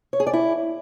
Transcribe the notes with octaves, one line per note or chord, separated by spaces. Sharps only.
C#5
G#4
D5
E4